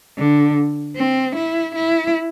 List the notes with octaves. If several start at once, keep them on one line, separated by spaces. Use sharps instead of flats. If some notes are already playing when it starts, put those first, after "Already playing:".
D3
C4
E4
E4